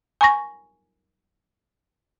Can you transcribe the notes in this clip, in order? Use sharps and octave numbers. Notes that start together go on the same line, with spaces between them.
G#5 A#5 C#6 A#6